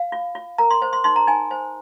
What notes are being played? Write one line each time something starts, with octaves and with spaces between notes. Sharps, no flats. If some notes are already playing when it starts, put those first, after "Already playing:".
Already playing: F5
F4
F4
A#4 A#5
C6
C5
C6
D#4 C6
A#5
D#4 G#5
C5